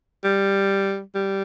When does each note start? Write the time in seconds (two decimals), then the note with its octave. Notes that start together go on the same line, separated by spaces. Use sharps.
0.24 G3
1.15 G3